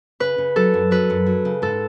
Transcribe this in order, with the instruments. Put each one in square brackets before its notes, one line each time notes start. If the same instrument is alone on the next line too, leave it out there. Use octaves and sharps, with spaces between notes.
[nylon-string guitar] C#3 [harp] B4
[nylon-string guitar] C#3
[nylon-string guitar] F#3 [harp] A4
[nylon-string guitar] F#2
[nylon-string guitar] F#3 [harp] B4
[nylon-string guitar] F#2
F#3
C#3
[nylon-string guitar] G#2 [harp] A4